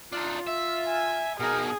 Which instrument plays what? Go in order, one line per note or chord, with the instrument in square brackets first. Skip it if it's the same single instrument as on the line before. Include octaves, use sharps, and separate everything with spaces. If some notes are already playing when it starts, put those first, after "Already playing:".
[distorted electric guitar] D4 D#4 [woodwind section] F4
[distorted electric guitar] E5
[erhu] G#5
[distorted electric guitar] B2 D#4 [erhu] G#4 [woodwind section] A#4